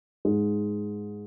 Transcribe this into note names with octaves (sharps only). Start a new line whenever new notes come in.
G#2 G#3